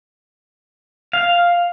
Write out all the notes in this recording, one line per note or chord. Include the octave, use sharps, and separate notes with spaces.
F5